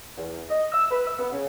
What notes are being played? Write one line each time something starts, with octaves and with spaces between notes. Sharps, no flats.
E2
D#5
E6
B4
E6
B3
C#3